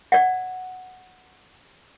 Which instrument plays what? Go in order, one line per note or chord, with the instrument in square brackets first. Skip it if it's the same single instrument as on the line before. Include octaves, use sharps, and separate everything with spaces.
[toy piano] D5 F#5